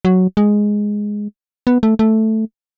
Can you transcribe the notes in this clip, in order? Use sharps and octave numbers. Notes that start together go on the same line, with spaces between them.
F#3
G#3
B3
A3
A3